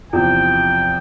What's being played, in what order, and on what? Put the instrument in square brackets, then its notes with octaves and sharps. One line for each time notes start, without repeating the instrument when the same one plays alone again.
[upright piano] E2 C3 F3 [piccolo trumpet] G5